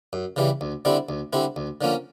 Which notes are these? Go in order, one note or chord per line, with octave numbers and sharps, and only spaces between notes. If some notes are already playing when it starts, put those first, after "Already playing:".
F#2
C#3 E3 G3
D2
D3 G3 C4 E4
D2
D3 G3 C4 E4
D2
D3 F3 A#3 C#4